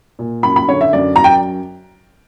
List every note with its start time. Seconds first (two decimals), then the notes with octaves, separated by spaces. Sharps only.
0.19 A#2
0.43 F#2 B5
0.56 B5
0.68 D3 C#5
0.81 E5
0.93 F#2 D5
1.16 F#2 A#5
1.24 G5